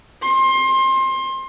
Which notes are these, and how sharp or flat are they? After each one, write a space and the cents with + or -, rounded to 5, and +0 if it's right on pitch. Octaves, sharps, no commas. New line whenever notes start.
C6 +25